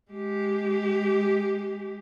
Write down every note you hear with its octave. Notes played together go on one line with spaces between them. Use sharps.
G#3 G4